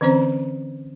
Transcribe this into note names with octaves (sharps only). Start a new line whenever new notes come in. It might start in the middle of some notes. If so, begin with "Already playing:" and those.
D3 E3 C4 C#4 C5 A#5